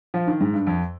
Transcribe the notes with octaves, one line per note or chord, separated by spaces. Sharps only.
F3
D#3
G#2
G2
F2